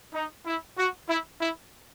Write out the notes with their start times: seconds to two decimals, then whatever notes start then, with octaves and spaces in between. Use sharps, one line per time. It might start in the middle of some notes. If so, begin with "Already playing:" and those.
0.14 D#4
0.46 E4
0.78 F#4
1.09 E4
1.41 E4